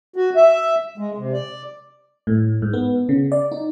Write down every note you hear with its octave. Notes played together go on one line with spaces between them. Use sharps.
F#4
E5
G#3
C3
D5
A2
G#2
B3
C#3
D5
D#4